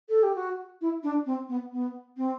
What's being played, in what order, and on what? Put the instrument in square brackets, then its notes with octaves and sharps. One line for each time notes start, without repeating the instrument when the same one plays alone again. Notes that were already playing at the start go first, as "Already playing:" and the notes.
[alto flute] A4
G4
F#4
E4
D4
C4
B3
B3
C4